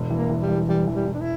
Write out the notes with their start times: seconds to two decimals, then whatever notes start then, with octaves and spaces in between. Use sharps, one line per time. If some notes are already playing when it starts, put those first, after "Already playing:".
Already playing: E1
0.10 E3
0.16 A#3
0.29 E3
0.42 G3
0.49 E3
0.68 E3 G3
0.87 E3
0.95 G3
1.07 E3
1.14 D4
1.21 E4